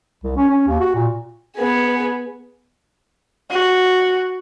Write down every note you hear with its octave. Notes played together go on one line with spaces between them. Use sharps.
C2
C#4
C#4
D#2
F#4
A#2
B3 G#4
F#4